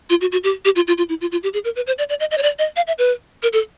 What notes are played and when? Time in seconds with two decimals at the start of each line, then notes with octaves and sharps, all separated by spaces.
0.10 F4
0.21 F#4
0.32 F#4
0.44 G4
0.65 G4
0.76 F4
0.88 F4
0.98 F4
1.09 E4
1.21 F4
1.32 F4
1.43 G4
1.54 G#4
1.65 A#4
1.76 B4
1.87 C5
1.98 D5
2.09 D5
2.20 D#5
2.31 D#5
2.38 C#5
2.43 D5
2.59 D#5
2.76 F5
2.87 E5
2.98 B4
3.43 A#4
3.53 A4